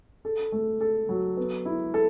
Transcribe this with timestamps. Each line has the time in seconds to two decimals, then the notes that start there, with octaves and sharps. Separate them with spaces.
0.25 A4
0.52 A3
0.81 A4
1.09 F#3
1.37 B3
1.66 E4
1.94 A4